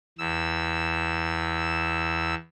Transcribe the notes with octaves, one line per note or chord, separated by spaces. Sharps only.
E2 E6